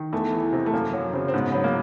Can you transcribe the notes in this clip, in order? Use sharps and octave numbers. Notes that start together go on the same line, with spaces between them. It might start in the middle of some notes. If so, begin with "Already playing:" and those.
Already playing: D#3
E2 A3
E3
C3
A3
F#2 A#3
F#3
C#3 C4
C4
G#2 B3
F#3 B3
A#3